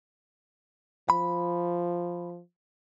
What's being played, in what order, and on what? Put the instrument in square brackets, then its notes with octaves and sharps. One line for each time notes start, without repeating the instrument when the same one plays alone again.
[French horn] F3 [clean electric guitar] B5